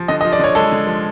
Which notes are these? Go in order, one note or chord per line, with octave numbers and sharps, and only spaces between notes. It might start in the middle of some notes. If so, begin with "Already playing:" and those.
Already playing: F3
D3 D#5
D#5
F3
D5
D3 C#5
G#3 A4
D3
F3